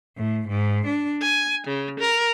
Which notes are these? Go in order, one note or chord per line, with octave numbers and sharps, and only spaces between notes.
A2
G#2
D4
G#5
C#3
A#4